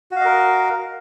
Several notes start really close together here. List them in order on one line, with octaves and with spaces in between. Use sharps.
F#4 F5 D#5 A#4